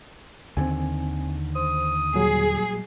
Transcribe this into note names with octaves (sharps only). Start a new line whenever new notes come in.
D#2 D3 D#3 C4 G#5
C5 D#6
A#2 F#3 G3 G#4